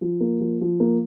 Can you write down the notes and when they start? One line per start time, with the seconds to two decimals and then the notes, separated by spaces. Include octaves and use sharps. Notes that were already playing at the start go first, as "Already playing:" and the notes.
0.01 F3
0.20 A#3
0.40 F3
0.61 F3
0.80 A#3